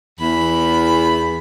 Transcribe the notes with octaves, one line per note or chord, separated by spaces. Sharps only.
E2 B5